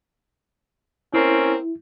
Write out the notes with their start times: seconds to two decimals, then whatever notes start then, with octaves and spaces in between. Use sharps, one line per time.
1.14 A#3 C4 C#4 E4